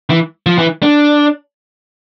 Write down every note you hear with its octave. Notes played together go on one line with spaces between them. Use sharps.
E3
F3
E3
D4